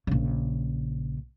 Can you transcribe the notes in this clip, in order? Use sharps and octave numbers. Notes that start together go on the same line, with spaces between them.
A#1 C#3